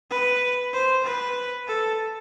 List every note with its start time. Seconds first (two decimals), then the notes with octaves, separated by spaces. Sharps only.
0.11 B4
0.73 C5
1.05 B4
1.68 A4